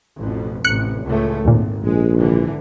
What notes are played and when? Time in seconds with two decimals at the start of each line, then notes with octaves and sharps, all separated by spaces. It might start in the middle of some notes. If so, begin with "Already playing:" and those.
0.19 A1 F2 B2
0.64 A1 C3 F#6 C#7
1.05 C#2 A2 A3
1.45 G#1 D#2 A#2
1.84 A#1 G#3
2.18 G#1 D3 E3